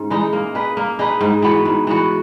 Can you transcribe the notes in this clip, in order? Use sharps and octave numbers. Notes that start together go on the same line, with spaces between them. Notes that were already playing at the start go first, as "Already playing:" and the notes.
Already playing: G#2 C#4
E3 G#3 D#4
A#3
D#4 G#4 B4
A#3
D#4 G#4 B4
G#2
E3 B3 F#4
G#2
E3 B3 F#4